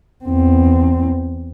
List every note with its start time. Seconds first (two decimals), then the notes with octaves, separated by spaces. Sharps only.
0.25 E2 C4